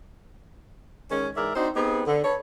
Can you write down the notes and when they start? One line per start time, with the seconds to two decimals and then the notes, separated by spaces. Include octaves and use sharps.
1.11 D#3 G#3 C#4
1.37 G#2 E3 A#4 D5 E5
1.56 C4 D4 D#4 F#4 C5
1.75 B3 C4 D#4 G4 G#4
2.07 D3
2.24 A4 B4 C#5